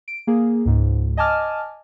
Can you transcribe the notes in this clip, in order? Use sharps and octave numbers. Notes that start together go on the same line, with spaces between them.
D7
A#3 G#4
C#2 G#2
D#5 G#5 A5 D6 F6